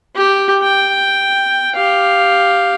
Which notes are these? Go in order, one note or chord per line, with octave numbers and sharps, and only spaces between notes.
G4
G5
G4 F5